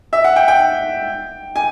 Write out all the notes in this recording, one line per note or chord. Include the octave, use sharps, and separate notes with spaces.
E5
F#5
G5
G5
G#5